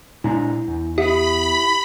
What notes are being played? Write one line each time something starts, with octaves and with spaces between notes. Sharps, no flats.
A#2 G#3 D4 E4 A#5
E2
E4 G4 E5 F#5 B5